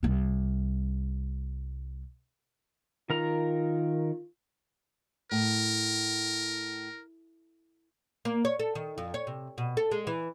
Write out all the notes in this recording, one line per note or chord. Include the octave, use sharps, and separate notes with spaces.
C2 G3
D#3 F4 A#4 A#5
A2 A#4
A#3
C#5
A4
D#3
F2
C#5
C3
B2
A4
G#3
E3